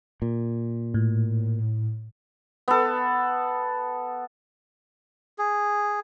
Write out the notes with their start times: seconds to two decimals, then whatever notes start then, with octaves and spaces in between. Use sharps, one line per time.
0.22 A#2
0.94 A2
2.68 B3 A4
5.38 G#4